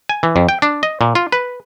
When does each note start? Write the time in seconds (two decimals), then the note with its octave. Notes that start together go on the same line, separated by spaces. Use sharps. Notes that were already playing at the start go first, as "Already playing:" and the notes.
0.09 G#5
0.23 E3
0.36 F2
0.49 G5
0.62 D4
0.83 D#5
1.01 A#2
1.15 F4
1.32 B4